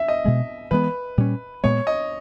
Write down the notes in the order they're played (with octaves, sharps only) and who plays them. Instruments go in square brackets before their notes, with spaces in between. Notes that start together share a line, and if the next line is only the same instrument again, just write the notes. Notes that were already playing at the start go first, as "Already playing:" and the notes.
Already playing: [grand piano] E5
D#5
[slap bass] B2 G#3 B3
[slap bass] E3 G#3 B3 [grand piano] B4
[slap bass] A#2 G3 C#4
[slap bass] A#2 G#3 B3 [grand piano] C#5
[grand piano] D#5